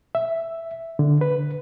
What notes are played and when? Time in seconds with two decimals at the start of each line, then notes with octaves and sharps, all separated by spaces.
0.15 E5
0.99 D3
1.21 B4